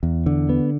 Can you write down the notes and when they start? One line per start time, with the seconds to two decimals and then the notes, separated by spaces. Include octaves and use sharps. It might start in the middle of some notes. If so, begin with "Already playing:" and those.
0.03 E2
0.26 D3
0.49 B3